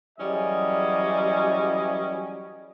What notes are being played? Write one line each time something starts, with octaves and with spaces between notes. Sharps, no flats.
E3 F#3 G3 C#4 G#4 D#5